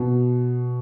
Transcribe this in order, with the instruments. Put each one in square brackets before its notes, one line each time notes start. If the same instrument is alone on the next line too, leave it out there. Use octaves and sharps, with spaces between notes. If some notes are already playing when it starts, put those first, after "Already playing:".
Already playing: [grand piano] B2